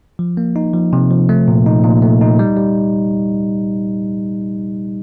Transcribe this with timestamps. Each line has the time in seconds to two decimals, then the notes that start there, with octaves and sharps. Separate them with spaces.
0.19 F3
0.37 A#3
0.56 D#4
0.73 F3
0.93 C3
1.11 F3
1.29 A3
1.48 A#2
1.66 D#4
1.84 A#2
2.02 A3
2.21 D#4
2.39 G3
2.57 G3